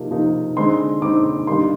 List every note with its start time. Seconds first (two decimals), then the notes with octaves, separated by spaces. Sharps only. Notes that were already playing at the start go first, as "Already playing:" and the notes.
Already playing: C3 F3 A#3 D#4
0.11 C3 F3 A#3 D#4
0.56 D3 G#3 C4 D#4 C6
1.02 D3 G#3 C4 D#4 D6
1.47 G2 D3 G3 A#3 D#4 C6